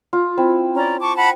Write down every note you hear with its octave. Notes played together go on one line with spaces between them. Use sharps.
F4
C4 E4
C#4 D5 A#5
A5 C#6 D6
F#5 A5 B5